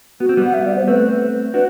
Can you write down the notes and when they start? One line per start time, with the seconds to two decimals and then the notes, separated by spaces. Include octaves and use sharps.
0.20 B3 F#4
0.29 C4
0.37 G3 B3
0.46 F#5
0.54 E5
0.65 D5
0.76 C5
0.88 A3 C4 B4
1.54 D4 F#4 B4